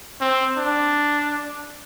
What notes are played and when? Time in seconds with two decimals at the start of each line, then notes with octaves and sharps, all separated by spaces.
0.20 C4
0.57 D4